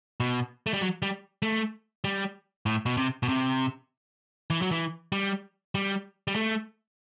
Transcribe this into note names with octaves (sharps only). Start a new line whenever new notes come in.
B2
A3
G3
F#3
G3
A3
G3
A2
B2
C3
B2
C3
E3
F#3
E3
G3
G3
G3
A3